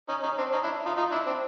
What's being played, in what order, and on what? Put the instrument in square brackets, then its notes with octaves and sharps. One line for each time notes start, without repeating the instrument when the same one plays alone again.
[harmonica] C#4 D#4
C#4 D#4
C4 D4
C#4 D#4
D4 E4
D#4 F4
D#4 F4
D4 E4
C4 D4